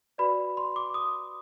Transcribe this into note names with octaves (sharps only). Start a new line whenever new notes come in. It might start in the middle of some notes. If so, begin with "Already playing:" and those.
F#4 B4 D5 B5
C6
D6
D#6